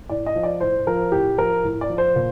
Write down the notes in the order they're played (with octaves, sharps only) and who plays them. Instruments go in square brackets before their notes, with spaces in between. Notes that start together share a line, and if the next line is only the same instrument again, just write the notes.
[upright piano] A2 D5
D#5
F3
D5
A2 C5
F3 A#4
A2 G4
F3 A#4
A2
D5
F3
C5
A#2